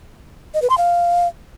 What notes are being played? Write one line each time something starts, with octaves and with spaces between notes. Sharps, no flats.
D#5
B4
C6
F5